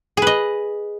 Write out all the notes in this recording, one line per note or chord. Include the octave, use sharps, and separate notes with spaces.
G#4 B4 D#5